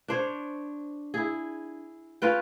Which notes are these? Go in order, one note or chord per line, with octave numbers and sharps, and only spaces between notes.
D4 C5 C#5
E4 G#4
C#4 F4 B4 G5